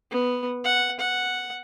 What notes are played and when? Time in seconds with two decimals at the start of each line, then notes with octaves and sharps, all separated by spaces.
0.11 B3
0.64 F#5
0.99 F#5